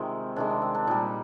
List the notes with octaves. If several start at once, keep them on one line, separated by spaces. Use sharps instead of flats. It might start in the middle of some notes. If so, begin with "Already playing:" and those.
Already playing: C3 D#3 G#3 C4 F4
C3 D#3 G#3 D4
D4
C4
D4
A#2 G3 D#4